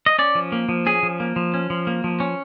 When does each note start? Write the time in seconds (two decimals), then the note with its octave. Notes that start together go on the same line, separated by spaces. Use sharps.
0.06 D#5
0.19 C#4 D5
0.35 F3
0.52 A#3
0.69 F3
0.86 C#4 G#4
1.03 F3
1.20 A#3
1.36 F3
1.54 C#4
1.70 F3
1.87 A#3
2.04 F3
2.20 C#4